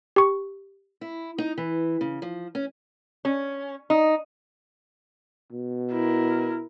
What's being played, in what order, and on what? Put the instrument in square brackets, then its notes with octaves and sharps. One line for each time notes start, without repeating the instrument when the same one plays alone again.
[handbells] G4 C#6
[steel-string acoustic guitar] E4
D#4
E3
C#3
F3
C#4
[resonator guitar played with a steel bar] C#4
D#4
[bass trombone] B2
[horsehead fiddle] E4 A#4